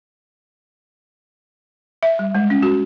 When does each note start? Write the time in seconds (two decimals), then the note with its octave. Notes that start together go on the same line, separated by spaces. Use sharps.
2.03 E5
2.19 G3
2.35 G#3
2.50 C#4
2.63 F#4